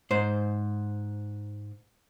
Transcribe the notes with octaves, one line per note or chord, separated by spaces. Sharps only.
G#2 C5